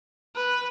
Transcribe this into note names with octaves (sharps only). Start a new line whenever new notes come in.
B4